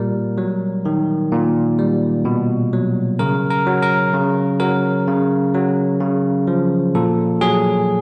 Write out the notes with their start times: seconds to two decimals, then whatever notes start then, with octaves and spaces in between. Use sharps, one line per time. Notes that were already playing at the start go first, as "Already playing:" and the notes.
Already playing: A#2 G3 A#4
0.38 F#3
0.85 D#3
1.32 A#2
1.79 G3
2.25 B2
2.73 F#3
3.19 C#3 A#4
3.51 A#4
3.67 F#3
3.83 A#4
4.14 C#3
4.60 F#3 A#4
5.07 C#3
5.54 F#3
6.01 C#3
6.47 F3
6.95 A#2 A4
7.41 F#3 G#4